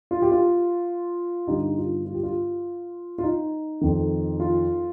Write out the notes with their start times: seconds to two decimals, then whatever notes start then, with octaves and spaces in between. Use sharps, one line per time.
0.11 F4
0.22 G4
0.32 F4
1.47 G2 D3 D#4 G4
1.77 F4
2.05 F4
2.14 G4
2.23 F4
3.18 F4
3.23 D#4
3.81 F2 D#3
4.40 F4